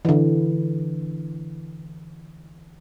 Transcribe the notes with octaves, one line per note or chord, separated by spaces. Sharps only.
D3 E3